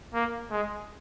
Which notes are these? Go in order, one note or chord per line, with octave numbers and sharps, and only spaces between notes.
A#3
G#3